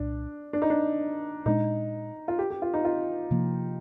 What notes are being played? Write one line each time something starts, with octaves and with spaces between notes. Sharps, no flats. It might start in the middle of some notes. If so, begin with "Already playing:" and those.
Already playing: C2 A#2 D4
D4
D#4
D4
A#2 G#3 D4 D#4
F4
G4
G4
F4
D#4
F4
C3 F3 A#3